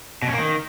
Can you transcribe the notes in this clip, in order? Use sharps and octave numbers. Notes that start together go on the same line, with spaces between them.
B2
C#4
A#3
D#3